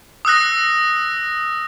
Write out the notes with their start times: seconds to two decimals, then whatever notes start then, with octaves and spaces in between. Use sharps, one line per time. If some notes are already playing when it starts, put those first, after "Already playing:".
0.25 D#6 E6 F#6 A#6